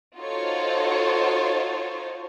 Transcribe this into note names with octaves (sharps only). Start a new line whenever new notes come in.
D#4 F4 F#4 A4 C5 C#5